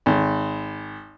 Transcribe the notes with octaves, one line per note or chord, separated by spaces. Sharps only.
G#1